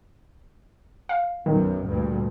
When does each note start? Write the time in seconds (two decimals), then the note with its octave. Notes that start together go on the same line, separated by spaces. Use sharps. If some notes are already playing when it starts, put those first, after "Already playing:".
1.09 F5
1.46 B1 F#2 D#3
1.84 D2 G2 A#2